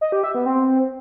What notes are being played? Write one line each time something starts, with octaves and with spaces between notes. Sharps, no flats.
D#5
G4
E5
B3
C4